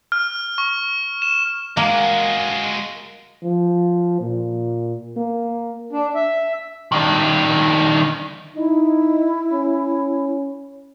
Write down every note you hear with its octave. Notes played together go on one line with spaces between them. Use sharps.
F6
C#6
E7
G#3 A#3 F#4
F3
A#2
A#3
D4
E5
D#3 D4
D#4 E4
C#4